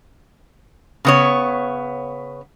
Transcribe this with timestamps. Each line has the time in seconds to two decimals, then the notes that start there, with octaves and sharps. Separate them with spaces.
1.05 C#3 B3 C#5